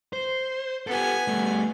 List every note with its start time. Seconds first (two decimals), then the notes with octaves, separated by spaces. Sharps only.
0.13 C5
0.87 B3 G4 A4 G#5
1.28 G3 A3